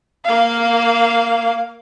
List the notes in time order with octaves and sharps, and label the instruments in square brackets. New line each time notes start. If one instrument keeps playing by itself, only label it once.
[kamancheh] A#3 F5